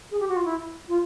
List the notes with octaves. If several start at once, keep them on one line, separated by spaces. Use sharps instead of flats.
G#4
G4
F#4
F4
E4
F4